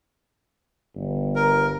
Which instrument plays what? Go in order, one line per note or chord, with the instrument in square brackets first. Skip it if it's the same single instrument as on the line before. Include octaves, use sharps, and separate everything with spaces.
[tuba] G1
[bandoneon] A#4